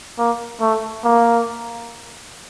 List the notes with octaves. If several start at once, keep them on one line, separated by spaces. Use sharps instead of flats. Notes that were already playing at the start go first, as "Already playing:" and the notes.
A#3
A3
A#3